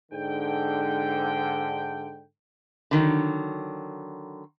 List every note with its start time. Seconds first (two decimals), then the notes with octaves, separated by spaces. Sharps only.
0.12 G#2 D3 G5
2.91 D3 D#3 F#3